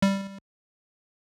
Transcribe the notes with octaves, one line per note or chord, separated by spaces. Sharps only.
G3